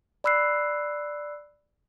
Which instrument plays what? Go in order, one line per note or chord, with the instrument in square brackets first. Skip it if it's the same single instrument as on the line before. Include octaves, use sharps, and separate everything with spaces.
[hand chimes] D5 B5 E6 F#6 C7